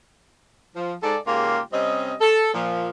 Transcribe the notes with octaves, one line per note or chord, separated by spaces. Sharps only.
F3
G#2 A4 D5
G#2 C#3 A#3 F4 G4 F5
C3 G3 C4 C#4 D#5
A4
A#2 F3